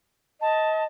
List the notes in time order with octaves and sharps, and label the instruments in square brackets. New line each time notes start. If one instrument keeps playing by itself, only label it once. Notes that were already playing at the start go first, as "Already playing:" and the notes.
[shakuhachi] D#5 [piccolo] A5